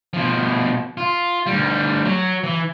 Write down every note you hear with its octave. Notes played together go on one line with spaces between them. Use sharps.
B2 F3
F4
D2 G3
F#3
E3